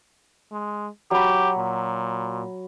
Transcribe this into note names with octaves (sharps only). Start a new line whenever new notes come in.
G#3
F#3 G4 B5
A#2